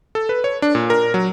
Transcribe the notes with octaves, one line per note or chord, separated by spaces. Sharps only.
A4
B4
C#5
D4
A#2
A#4
F#3